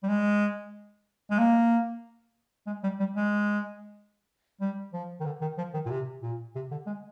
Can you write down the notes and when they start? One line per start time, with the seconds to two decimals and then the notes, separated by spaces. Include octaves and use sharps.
0.03 G3
0.09 G#3
1.31 G#3
1.39 A#3
2.67 G#3
2.84 G3
3.00 G3
3.16 G#3
4.61 G3
4.93 F3
5.20 D#3
5.26 D3
5.41 D#3
5.58 F3
5.74 D#3
5.86 A#2
5.90 C3
6.22 A#2
6.55 C3
6.71 D3
6.87 G#3